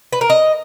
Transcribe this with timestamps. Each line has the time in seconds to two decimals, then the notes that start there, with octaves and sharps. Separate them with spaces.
0.13 B4
0.21 A#4
0.30 D#5